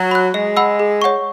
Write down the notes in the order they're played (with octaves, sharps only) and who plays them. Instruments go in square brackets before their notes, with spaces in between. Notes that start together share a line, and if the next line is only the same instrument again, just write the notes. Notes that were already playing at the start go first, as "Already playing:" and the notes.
Already playing: [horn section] F#3
[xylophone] B5 F#6
[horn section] G#3 [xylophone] D#5
[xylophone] F#5 B5 E6
G#4
C#5 F#5 C#6